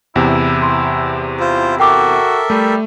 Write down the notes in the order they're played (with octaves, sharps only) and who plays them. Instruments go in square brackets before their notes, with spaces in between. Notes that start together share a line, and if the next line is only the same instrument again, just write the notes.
[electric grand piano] E2 C3 [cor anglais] E4
[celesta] C6
[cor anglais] E4 [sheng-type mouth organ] F4 C5
[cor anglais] F#4 [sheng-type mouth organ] A4 A#4 E5 [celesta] G5 D6
[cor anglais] G3 [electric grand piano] A3